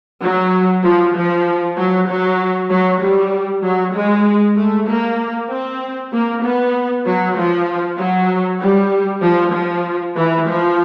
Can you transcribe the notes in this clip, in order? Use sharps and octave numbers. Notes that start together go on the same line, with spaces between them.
F#3
F3
F3
F#3
F#3
F#3
G3
F#3
G#3
A3
A#3
C4
A#3
B3
F#3
F3
F#3
G3
F3
F3
E3
F3